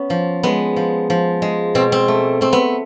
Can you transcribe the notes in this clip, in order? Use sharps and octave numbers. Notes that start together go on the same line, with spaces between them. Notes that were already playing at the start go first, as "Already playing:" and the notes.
Already playing: B3 C#4
F3
G#3 B3
F3
F3
G#3
B2 C4
C4
A3
A3 C4
B3